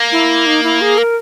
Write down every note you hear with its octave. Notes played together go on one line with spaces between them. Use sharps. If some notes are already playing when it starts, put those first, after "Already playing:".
Already playing: A#3
E4
D#4
E4
G#4
A#4